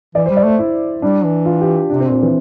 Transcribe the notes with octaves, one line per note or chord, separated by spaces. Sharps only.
E3 D5
C5
G3
D5
A3 C5
E4
G3 D4
E3
F4
G4
C3 D4
C4
A#2 C4
E3